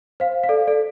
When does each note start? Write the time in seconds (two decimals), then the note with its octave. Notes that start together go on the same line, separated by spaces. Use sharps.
0.20 C5 F5
0.44 F5
0.49 A4 D5
0.67 A4 D5